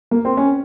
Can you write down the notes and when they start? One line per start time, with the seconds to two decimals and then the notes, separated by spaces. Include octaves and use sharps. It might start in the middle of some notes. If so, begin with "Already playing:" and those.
0.11 A#3
0.25 C4
0.37 C#4